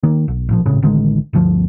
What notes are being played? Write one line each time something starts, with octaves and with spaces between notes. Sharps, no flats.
D#3 A#3
B1
A1 A#2 F3
G#1 A2 C#3
A1 D3 D#3 G#3
G1 D2 F3